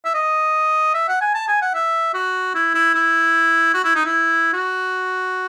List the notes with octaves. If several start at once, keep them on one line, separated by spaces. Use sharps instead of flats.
E5
D#5
E5
F#5
G#5
A5
G#5
F#5
E5
F#4
E4
E4
E4
F#4
E4
D#4
E4
F#4